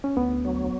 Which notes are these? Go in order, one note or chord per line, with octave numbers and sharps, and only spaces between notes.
C#4
D2 B3
F#3